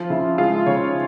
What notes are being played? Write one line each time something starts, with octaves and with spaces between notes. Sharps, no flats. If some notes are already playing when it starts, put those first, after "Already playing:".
Already playing: F3 F4
C#3 E4
G#3 F4
C#3 C#5